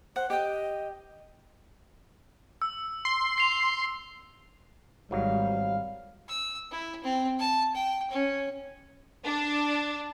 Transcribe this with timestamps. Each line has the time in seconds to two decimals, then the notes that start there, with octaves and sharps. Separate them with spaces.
0.16 C5 F#5
0.30 G4 D#5 G5
2.62 E6
3.05 C6
3.38 C7 F7
5.11 G#1 G#2 F#3 G3 F5
6.29 E6
6.71 E4
7.04 C4
7.39 A5
7.75 G5
8.11 C#4
9.25 D4